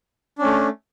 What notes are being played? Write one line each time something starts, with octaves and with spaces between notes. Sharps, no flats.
A3 C#4 D4